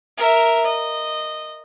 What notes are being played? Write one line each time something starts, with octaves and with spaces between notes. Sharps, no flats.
A#4 E5
D#5